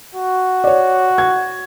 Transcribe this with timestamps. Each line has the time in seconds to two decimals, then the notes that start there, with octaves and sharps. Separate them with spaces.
0.15 F#4
0.64 C#5 D5
1.18 G#6